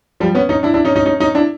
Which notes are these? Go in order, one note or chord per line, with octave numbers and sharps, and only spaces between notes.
F3 G3
B3 C#4
C#4 D#4
D4 E4
D4 E4
C#4 D#4
C#4 D#4
C#4 D#4
C#4 D#4
D4 E4